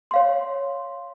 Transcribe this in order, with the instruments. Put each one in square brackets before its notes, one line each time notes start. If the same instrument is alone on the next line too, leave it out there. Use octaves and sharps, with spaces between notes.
[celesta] C#5 F5 C6